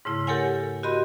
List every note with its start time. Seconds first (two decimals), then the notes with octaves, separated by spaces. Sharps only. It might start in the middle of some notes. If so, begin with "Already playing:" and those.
0.05 G#2 C#3 A3 E4
0.27 G4 A4 A#4 C#5 F#5 G#5
0.83 F#4 G4 A#4 D#5 B5 C6